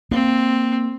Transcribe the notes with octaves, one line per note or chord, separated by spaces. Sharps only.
A#3 C4